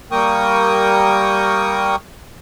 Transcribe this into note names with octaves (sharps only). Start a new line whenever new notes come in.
G3 A#3 A#4 G5 C#6 D#6